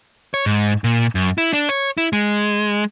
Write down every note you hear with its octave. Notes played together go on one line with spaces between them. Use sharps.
C#5
G#2
A#2
F#2
E4
D4
C#5
E4
G#3